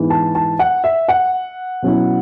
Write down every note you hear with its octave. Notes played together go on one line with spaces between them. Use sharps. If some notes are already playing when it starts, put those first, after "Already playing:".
Already playing: G#2 E3 B3 E4
A5
A5
F#5
E5
F#5
B2 F#3 C#4 E4